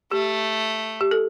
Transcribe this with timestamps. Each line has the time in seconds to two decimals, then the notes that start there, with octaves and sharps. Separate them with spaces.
0.12 A3 G4
1.01 G4
1.11 A4